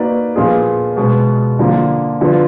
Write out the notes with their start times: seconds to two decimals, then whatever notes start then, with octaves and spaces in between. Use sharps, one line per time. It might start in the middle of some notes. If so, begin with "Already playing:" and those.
Already playing: A#3 D#4 F#4 B4 D5
0.36 A#2 F3 B3 F4 G#4
0.97 B2 G#3 B3
1.59 D3 F3 A#3 F4
2.21 D3 F3 B3 F4